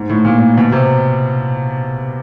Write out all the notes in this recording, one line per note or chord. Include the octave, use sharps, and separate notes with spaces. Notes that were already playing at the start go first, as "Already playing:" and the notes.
Already playing: G#2
A2
A#2
B2
C3